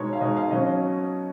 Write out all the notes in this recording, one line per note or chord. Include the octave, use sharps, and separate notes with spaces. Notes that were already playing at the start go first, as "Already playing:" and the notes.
Already playing: B2 G#3 D#4 C#5
F5
B2 G#3 D#4 D#5
F5
B2 F#3 C#4 D#5